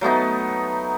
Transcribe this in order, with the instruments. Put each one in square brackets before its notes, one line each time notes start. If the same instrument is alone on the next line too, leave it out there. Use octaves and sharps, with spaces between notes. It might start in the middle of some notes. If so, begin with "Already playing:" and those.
[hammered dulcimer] F#3 A3 B3 D#4